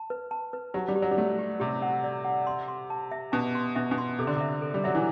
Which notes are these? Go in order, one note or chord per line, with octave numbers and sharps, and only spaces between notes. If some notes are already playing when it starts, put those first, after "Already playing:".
Already playing: A5
B4
A5
B4
F#3 G4
G3
G4
F#3
G3
A3 G4
G4
C3 G4
F#5
D5
F#5
C6
C6
A5
E5
B2 A5
C6
B2 E5
B2
C6
C3 A4
D3
C3 E5
A4
G3
F#3 E5
E3